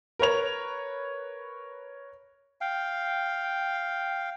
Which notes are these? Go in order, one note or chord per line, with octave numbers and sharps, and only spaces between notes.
A#4 B4 C#5 F7
F5 G5